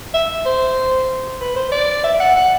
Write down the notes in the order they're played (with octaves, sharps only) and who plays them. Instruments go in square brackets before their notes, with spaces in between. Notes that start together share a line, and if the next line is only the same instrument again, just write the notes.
[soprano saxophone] E5
C5
B4
C5
D5
E5
F#5
F#5